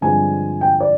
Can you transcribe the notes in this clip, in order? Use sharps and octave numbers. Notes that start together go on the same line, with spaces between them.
G2 D3 F3 G#3 C4 G#5
G5
D5